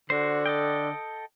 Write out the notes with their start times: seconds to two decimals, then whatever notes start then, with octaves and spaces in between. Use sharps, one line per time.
0.10 D3 F#4 C5
0.46 A4 D#5 G5